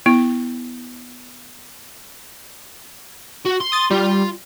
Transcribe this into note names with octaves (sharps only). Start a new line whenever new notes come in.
B3 E4
F#4
C6
D#6 A6
G3 F4